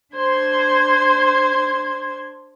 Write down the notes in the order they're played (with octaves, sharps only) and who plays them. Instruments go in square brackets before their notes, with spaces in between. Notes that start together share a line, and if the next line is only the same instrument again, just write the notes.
[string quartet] D4 C5 C6 G#6